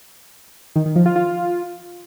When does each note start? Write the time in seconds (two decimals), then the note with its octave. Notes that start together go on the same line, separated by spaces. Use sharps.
0.76 D#3
0.86 D#3
0.96 F3
1.06 F4
1.16 F4